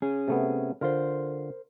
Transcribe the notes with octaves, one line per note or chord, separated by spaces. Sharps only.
C#4 G#4
C3 A3 B3
D3 F4 A#4 C5